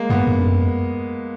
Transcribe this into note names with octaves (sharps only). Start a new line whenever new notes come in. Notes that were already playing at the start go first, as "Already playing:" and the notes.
Already playing: G#3 A#3
G2 B3
G2
F#2